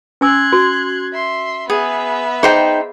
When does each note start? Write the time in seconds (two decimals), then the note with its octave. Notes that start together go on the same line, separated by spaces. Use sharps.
0.21 C#4 G#5 C6 E6 F#6 G#6
0.53 F#4
1.12 E5 C6
1.70 B3 G#4 E5
2.43 D#4 G#4 C5 G5